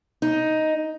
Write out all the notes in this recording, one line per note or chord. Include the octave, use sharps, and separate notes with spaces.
D#4